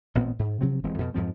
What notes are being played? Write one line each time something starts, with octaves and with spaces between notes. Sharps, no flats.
A1 A#2 B3 C4
G#2
C3 F3 F#3 C4
D#1 E3 G#3 C4
F2 B2
F2 G#2 F3 C4